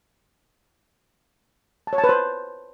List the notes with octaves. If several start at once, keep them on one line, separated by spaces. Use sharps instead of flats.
A5
C#5
A5
B4
C5